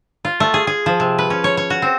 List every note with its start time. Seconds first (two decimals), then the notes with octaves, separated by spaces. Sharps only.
0.25 F4
0.40 A3
0.54 G#4
0.67 G#4
0.86 F3
1.00 C3
1.18 B4
1.30 C#4
1.44 C#5
1.57 C#5
1.70 F#4
1.82 C4